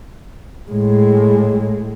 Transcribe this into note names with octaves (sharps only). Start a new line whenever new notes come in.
A2 G#3